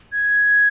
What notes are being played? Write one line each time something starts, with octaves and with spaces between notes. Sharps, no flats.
G#6